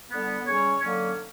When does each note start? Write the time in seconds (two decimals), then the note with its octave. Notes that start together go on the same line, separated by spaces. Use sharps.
0.10 D3 G3 B3
0.46 C#3 G3 C#4 C#5
0.82 D3 F#3 A#3 C#4